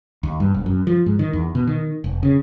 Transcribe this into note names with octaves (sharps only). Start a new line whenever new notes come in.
D#2
G2
E1
F#2
F3
G#2
D#3
E2
B2
D#3
F1
C#3